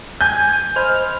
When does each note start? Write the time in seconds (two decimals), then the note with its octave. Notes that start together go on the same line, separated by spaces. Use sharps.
0.21 G#5 G6
0.76 C5 D#5 B5 F6